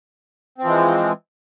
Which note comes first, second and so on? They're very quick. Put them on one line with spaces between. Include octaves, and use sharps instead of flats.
C4 F3 E3 G#3